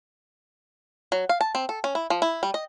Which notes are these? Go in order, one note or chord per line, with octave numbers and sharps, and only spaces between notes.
F#3
F5
A5
C4
A4
C#4
E4
F3
E4
G3
D#5